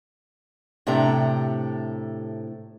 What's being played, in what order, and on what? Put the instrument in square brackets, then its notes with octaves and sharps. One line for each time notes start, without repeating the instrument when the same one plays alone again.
[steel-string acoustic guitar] A2 C3 D4 G4 A4 A#5